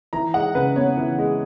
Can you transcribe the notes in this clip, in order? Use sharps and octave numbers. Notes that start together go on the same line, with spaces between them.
E3 A#5
G#3 F#5
C#3 B4
B3 C#5
E3
G#3